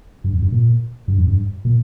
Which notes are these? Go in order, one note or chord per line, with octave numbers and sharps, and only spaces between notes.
G2
F2
G2
A#2
G2
F2
G2
A#2